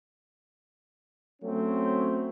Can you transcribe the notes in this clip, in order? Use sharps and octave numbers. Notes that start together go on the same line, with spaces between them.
F#3 A3 C4 C#4